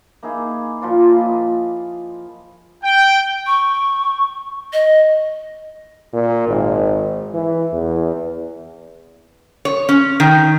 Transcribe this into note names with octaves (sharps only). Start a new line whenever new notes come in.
A#3 D#4 E4 G#4
A#2 F3 F4 D5
D#5 B5
G5
C#6
D#5
A#2
G#1
E3
E2
C#5
C#4
D#3